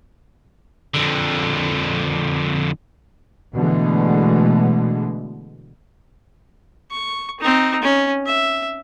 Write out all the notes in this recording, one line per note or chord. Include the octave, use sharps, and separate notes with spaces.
F2 D3
B2 D3 E3 G#3 A3
C#6
C4 D#4
C#4
E5